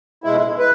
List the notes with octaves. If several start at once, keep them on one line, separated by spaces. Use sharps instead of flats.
B2 G#3 E4
B4